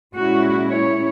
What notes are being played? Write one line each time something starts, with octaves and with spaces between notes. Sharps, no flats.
A#2 G#3 C#4 E4 F#4
C#5